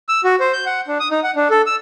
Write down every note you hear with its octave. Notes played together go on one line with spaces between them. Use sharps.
E6
F#4
C5
G6
F#5
D4
D#6
D#4
F#5
D4
A4
E6